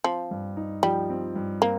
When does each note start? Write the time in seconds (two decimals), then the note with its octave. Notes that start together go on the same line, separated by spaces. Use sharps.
0.04 F3 C4
0.31 G2
0.57 D#4
0.83 F3 G3
1.10 C4
1.35 G2
1.61 A#3 C4